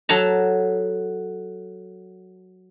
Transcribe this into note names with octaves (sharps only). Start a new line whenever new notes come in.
F#3 A4 A5 A#5